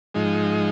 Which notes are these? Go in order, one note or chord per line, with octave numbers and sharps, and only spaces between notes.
G#2 F3 G#3 D#4